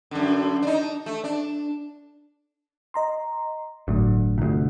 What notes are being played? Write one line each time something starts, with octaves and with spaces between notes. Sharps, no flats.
F#2 D3
D4 D#4
A3
D4
D#5 A#5 C6
G1 D2 A2 F#3
G1 D2 C3